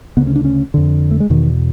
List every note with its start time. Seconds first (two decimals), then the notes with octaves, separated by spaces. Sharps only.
0.17 D2 C#3 B3
0.27 C#4
0.36 D4
0.45 C#4
0.74 F2 D3
1.11 A3
1.20 G#3
1.30 E2 B2 D#3